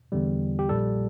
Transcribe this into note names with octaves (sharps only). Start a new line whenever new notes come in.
E2 D3 G3
G4
A#1 A#2 G3 A4